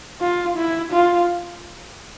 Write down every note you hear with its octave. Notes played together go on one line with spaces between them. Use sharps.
F4
E4
F4